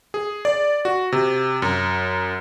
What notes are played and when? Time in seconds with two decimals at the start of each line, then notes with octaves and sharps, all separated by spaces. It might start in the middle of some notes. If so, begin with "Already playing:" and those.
0.14 G#4
0.45 D5
0.85 F#4
1.12 C3
1.62 F#2